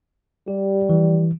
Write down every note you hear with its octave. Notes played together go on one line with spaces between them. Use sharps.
G3 G4
E3